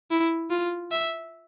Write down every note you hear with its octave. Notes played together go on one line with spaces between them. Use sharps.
E4
F4
E5